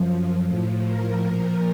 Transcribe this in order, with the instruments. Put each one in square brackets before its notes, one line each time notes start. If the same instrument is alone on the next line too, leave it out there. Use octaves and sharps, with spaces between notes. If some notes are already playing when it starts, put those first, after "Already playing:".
Already playing: [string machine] F#2 F3
A2 F3
A#4
A#2 F3